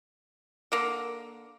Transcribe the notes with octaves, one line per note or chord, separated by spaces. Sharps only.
D3 A#3